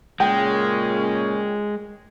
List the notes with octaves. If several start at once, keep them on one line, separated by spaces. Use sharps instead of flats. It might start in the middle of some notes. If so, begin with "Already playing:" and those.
A#2 C#3 G#3 C#4 G5